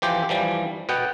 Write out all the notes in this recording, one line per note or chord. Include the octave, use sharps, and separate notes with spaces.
E3 F3 G4 C5
E3 F3 G3
B2 B3 F#5 G5